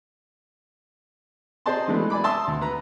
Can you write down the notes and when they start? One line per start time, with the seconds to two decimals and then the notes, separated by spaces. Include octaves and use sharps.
1.66 G#4 C5 D5 D#5 A5 C6
1.88 E3 F#3 G#3 A3 B3 D4
2.10 D5 G#5 B5 D6
2.24 E5 A5 C6 D#6 E6
2.47 D2
2.61 B4 A#5